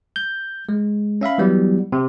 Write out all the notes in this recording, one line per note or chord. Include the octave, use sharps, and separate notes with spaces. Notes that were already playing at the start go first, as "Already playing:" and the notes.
G6
G#3
C#4 E5 F5 B5
E3 F#3 G3 B3
C3